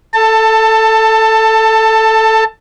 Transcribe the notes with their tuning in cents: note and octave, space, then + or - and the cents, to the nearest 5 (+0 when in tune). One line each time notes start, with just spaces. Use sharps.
A4 +0 A5 +20